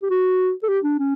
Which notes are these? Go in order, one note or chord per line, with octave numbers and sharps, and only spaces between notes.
G4
F#4
A4
G4
D4
C#4